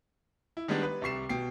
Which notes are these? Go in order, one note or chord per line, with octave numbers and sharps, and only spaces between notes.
E4
D#3 G3 G#3 B3 D4
B4
C2 G3 C#6 C7 E7
B2 G5 C7